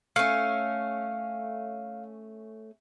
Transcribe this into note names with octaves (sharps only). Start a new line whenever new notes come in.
A3 C#4 F5